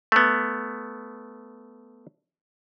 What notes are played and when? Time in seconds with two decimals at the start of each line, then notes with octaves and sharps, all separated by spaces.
0.12 A3 B3